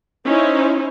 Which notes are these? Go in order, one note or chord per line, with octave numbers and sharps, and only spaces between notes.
C#4 D#4 E4 C5